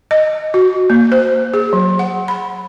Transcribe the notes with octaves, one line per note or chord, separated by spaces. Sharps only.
D#5
F#4
A#3
C5
G#4
F#3
F#5
B5